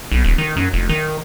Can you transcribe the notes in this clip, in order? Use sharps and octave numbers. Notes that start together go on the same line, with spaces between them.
B1
D#1
D#3
F#2
F1
D#3